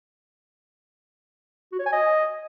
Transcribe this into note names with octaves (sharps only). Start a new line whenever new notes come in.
F#4
C#5
G#5
D#5